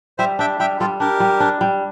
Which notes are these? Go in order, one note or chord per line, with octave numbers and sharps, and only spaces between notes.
G3 C5 E5
D4 E5 G5
G3 E5 G5
G3 F4 A4
D4 G4 A#4
G3
D4
G3